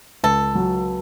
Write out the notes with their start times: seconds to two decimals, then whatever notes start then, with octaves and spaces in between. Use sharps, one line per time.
0.24 C#2 A4
0.55 F#3